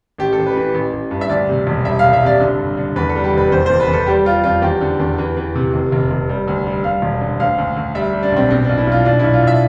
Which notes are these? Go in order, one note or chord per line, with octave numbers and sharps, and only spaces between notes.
A1 G4
A4
A1
B4
E3
A1
A1
G2
E5
D2 D5
C3
E1
G3 E5
C2 F5
E5
C3 D5
D3
G2
D3
E2 B4
A4
G3
G4
F1 B4
E2 C5
E2 C5
B4
E2 A4
G3 G4
G3 F4
F2 F4
E2 G4
D3
E2
E3
E3
C3
F1
F1
F1
G3
D2
G3
G3 F5
E1
D3
D2 F5
D2
D2
G3 E5
G3
D4
B1 C4
B2 C4
B1 D4
E4
B1 F4
B1 D4
B1 E4
F4
B1
E5